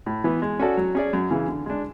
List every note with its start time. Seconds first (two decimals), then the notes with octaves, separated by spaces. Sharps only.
0.06 A2
0.24 E3 B3
0.42 G#3
0.59 C#4 F#4 A4 D5
0.77 F#3
0.95 C#4 G#4 D5
1.13 F#2
1.31 C#3 E3
1.48 D3
1.66 G#3 D4